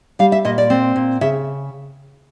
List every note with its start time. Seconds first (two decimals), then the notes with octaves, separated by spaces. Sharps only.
0.19 G3 F5
0.32 E5
0.45 A#2 D#5
0.58 D5
0.70 C4
0.96 A#2
1.21 C#3 E5